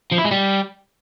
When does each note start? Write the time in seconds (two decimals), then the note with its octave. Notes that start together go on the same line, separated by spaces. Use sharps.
0.12 F3
0.19 E4
0.25 G#3
0.32 G3